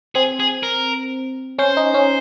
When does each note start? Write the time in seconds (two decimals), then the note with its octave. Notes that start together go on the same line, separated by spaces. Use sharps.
0.15 C4 G#4
0.40 G#4
0.63 A#4
1.58 C#4 C5
1.77 D#4
1.94 C#4